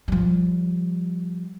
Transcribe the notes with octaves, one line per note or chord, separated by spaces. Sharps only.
F3 G3